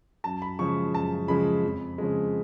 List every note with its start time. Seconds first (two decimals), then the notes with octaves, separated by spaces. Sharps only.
0.24 F#2 A5
0.42 B5
0.59 C#3 F3 G#3 C#6
0.94 F#2 A5
1.28 C#3 F3 G#3 B5
1.63 F2
1.98 C#3 F3 G#3